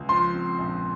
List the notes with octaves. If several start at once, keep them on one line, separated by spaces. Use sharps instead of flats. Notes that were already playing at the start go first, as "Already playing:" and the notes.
Already playing: C#2
F3 C6
C4
A#1